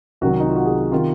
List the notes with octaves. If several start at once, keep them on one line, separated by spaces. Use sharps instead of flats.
C2 C3 D#3 F#3 F#4
D#4
F4
F#4
G#4
C3 D#3 F4